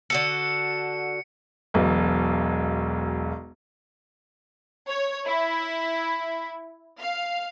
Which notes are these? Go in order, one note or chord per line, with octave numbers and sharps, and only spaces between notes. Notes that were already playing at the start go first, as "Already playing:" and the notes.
D3 F#4 A4 C#7
E1 B1
C#5
E4
F5